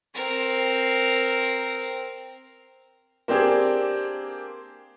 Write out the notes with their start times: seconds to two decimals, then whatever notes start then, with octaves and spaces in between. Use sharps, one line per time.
0.14 C4 A#4
3.28 A#3 C4 D4 G4 G#4